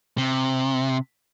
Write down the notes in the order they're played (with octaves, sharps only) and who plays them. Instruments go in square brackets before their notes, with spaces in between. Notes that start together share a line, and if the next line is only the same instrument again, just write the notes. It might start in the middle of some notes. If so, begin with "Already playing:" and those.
[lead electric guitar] C3